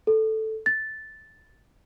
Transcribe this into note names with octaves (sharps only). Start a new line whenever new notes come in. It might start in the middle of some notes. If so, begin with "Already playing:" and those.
A4
A6